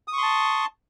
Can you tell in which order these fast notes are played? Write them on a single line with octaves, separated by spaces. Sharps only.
D#6 C#6 C6 A5